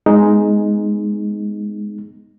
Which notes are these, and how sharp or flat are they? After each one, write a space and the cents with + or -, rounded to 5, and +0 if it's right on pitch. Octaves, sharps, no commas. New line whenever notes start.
G#3 +0 B3 +0 D#4 +0